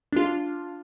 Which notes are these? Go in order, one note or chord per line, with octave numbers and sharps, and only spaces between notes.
D4 F4